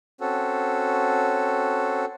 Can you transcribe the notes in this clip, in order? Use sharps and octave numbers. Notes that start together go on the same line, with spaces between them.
C4 C#4 F#4 A4